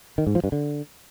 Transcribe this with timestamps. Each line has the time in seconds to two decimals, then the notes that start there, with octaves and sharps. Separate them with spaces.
0.18 D#3
0.27 G#2
0.35 F3
0.44 G2
0.52 D3